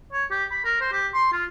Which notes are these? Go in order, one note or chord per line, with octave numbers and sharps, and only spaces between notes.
C#5
G4
B5
A#4
C5
G4
C6
F4